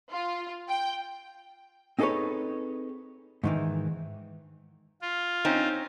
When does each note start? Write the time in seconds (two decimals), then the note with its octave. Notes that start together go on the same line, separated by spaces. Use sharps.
0.10 F4
0.69 G5
1.99 C4 D#4 G#4 A4 B4 C#5
3.44 G#2 D#3 E3
5.02 F4
5.45 C4 C#4 D#4